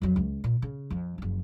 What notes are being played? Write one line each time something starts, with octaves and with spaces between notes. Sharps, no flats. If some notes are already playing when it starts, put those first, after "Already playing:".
F2 F#3
C#2
A#2
C#3
F2 F3
F#1 F3